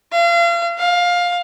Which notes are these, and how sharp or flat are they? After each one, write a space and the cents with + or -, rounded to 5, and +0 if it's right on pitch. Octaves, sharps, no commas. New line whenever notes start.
F5 -35
F5 +15